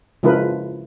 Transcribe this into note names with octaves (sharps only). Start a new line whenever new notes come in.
C#3 F3 G#3 E4 A#4 B4